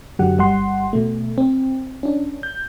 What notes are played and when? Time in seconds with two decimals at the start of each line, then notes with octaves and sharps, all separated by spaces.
0.19 F#2 D3 F#3 G4 F#5
0.38 G1 G3 F#5 C6
0.93 B2 A3
1.38 C4
2.03 C#4 D4
2.43 G6